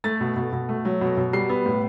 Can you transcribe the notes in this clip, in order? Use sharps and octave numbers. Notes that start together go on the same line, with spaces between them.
A3 A6
B2
B2
B2
A3
F#3
B2
B2
G3 C7
B3
A2